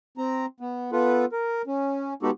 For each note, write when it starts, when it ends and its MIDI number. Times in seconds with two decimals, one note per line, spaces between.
0.18 0.46 60
0.18 0.46 82
0.60 0.91 59
0.92 1.25 59
0.92 1.25 65
0.92 1.25 69
0.92 1.25 71
1.32 1.62 70
1.67 2.14 61
2.23 2.30 56
2.23 2.30 59
2.23 2.30 63
2.23 2.30 66
2.23 2.30 67
2.23 2.30 69